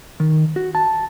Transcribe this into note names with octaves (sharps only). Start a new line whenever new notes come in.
D#3
F#4
A5